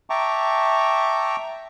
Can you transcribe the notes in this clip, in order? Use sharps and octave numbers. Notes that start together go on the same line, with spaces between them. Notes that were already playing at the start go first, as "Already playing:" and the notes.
E5 G5 A5 A#5 C#6 D6